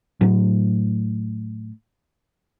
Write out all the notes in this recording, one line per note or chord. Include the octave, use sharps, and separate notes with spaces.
A2 F#3